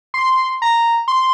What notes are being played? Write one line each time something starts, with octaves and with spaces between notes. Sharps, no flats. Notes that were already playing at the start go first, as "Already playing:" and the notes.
C6
A#5
C6